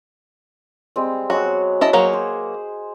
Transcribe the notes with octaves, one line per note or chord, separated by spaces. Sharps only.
G3 G#3 C4
F#3 G#3 B3 F#4
E4 D#5 A5
F#3 A#3 G#4 C5 C#5
C5